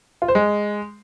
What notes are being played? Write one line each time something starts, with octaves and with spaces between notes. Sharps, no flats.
F4
C5
G#3